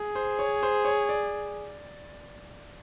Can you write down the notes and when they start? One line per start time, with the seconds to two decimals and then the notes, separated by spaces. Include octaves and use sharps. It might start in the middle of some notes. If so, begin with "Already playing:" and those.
Already playing: G#4
0.15 C5
0.39 C#5
0.63 C5
0.85 C#5
1.09 D5